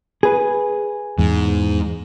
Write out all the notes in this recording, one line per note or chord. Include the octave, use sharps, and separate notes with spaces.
G#4 B4
E2 G#2